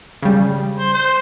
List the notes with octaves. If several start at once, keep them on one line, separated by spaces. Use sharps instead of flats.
C#3 G3
C5
C5